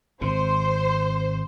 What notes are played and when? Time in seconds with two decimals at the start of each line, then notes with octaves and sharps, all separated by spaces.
0.21 G#1 C3 C5